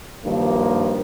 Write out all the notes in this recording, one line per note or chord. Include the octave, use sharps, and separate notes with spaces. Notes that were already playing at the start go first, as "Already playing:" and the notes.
G2 D#3 F3 F#3 A#3